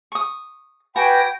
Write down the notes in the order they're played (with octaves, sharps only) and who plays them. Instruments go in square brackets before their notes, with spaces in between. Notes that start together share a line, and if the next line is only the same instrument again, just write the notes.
[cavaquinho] C#6 D#6
[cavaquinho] F#4 G4 G#5 [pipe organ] B4 A#6 [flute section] G5